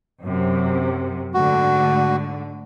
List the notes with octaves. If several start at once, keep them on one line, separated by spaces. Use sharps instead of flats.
F#2 C3
G#2 D3 A3 F#4